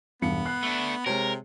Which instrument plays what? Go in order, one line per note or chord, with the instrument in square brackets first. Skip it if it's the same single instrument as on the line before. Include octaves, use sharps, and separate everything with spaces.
[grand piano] E1 G2 C#7 [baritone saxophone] B3
[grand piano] F#6 C7
[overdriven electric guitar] A3 D4
[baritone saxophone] C3 [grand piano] G#3 C#5 [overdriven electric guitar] A#4